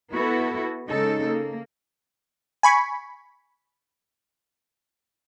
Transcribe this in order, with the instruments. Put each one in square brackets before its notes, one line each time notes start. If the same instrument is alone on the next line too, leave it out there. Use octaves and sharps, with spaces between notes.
[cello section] B3 E4 F#4 A4 B4
C#3 G#3 D#4 A4
A#3
[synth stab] G#5 B5 C#6